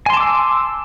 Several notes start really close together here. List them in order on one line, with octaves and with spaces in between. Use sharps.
G#5 C6 A5 D6 E6